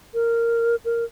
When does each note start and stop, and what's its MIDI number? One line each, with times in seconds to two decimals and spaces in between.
0.14 0.75 70
0.85 1.04 70